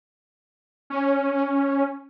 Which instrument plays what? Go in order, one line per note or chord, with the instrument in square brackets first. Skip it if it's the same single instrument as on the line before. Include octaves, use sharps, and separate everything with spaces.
[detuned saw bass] C#4